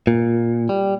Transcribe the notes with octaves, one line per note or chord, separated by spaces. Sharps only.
A#2
G3